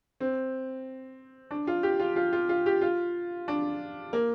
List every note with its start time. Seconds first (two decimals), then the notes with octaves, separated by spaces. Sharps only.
0.20 C4
1.51 D4
1.67 F4
1.83 G4
2.00 F4
2.16 F4
2.33 F4
2.49 F4
2.66 G4
2.82 F4
3.48 D4
4.13 A#3